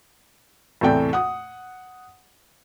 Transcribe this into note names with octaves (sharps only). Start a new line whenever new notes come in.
E2 A2 C3 A3 D5 G5
F#5 D#6